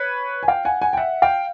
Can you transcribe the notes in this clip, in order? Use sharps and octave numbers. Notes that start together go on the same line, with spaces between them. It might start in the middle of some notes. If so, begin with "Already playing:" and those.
Already playing: B4 C#5
G#5
F5 G5
F#5 G#5
F#5 G#5
G5
E5 F#5
F5 G5